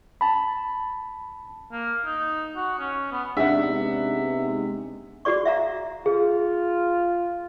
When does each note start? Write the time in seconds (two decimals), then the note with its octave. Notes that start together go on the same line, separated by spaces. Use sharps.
0.21 A5 B5
1.72 A#3
2.06 D#4
2.56 F#4
2.79 C#4
3.12 B3
3.37 C3 G#3 B3 D4 D#4 E5 F#5
5.25 F#4 G#4 D5 C#6
5.45 E5 F5 A#5
6.06 F4 G#4